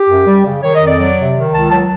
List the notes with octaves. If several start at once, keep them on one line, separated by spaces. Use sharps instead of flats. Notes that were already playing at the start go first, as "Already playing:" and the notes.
Already playing: G4
F#2
G3
C#3
D#3 C#5
D#5
F2
D5
F#3
C3
D#3
C#2 A5
F#3 A5